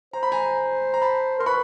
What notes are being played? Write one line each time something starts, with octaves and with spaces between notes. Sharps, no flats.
C5 A#5
B5
G#5 A#5
A#5
A5 B5
A#4 C6
B4 B5 C#6